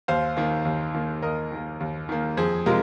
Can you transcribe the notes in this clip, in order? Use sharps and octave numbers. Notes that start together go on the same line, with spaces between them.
D#2 C5 F5
D#3 A#3
D#2
D#3 A#3
D#2 A#4 D#5
D#3 A#3
D#2
D#3 A#3
F2 G#4 C5
C3 G#3 F4 A#4